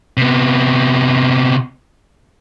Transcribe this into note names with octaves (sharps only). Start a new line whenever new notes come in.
C3 B3